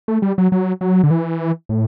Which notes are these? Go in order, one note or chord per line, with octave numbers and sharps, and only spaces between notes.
A3
G3
F#3
F#3
F#3
D3
E3
A2